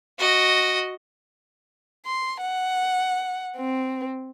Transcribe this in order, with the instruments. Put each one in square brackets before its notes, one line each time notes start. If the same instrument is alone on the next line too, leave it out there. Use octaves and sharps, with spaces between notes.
[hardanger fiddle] F#4 D#5
[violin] C6
F#5
C4